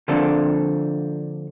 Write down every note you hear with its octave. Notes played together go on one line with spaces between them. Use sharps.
D3 F3 A#3 C4 D4 A4